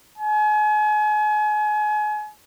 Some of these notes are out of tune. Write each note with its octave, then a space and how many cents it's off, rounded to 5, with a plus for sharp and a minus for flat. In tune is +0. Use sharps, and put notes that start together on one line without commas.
G#5 +35